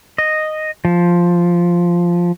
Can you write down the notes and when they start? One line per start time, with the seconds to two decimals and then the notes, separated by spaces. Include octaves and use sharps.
0.18 D#5
0.85 F3